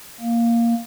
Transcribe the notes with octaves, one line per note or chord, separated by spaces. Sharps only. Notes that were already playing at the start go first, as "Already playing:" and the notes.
A#3